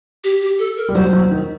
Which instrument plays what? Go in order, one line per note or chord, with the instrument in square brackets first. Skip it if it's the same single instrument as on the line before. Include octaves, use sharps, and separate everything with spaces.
[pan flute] G4
G4
A4
A#4
[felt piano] G3
[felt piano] F#3 [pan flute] C5
[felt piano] F#3
D#3